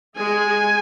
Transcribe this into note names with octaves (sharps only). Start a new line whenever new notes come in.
G#3 G#4 G#5